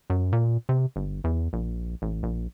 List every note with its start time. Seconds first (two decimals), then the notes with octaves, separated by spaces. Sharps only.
0.10 F#2
0.33 A#2
0.69 C3
0.96 G1
1.24 E2
1.53 A#1
2.02 A1
2.23 A#1